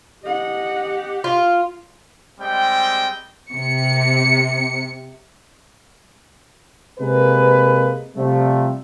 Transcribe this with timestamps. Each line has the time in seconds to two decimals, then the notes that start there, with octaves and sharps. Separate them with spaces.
0.24 G4 D#5 F#5
1.24 F4
2.40 G3 G#3 C4 D#5 G5
3.52 C3 C#7
6.99 C3 G#3 A#3 A#4 B4
8.15 C3 F3 G3 A3